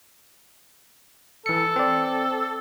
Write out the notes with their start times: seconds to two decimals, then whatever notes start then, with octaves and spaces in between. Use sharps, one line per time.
1.46 E3 A4 C#7
1.76 C4 D5